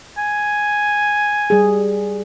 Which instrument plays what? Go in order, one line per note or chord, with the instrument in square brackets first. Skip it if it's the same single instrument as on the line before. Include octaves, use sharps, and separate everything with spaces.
[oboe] G#5
[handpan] G3 G#4